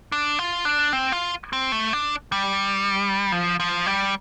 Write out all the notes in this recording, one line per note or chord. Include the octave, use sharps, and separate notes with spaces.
D4
F4
D4
C4
F4
C4
A3
D4
G3
F3
F3
G3